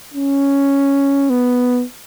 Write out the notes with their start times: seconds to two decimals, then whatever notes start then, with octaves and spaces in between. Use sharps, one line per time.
0.14 C#4
1.30 B3